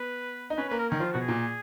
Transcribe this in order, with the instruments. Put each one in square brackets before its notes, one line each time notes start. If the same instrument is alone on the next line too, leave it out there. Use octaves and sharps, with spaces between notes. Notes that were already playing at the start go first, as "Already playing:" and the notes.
Already playing: [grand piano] B3 [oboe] B4
[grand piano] D#4
[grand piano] C#4 [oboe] B4
[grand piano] A#3 [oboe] B4
[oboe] A#4
[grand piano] D#3 [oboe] C#4
[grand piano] F3 [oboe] F4
[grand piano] B2 [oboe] F#4
[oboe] G#4
[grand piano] A#2